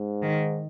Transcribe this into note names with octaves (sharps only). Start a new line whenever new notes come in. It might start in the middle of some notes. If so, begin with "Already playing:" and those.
Already playing: G#2
D#3